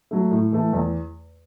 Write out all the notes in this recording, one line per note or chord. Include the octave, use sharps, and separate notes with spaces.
F#3 A3
A2
E3 A3
E2